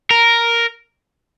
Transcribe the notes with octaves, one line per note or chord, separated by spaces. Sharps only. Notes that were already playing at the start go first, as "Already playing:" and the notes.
A#4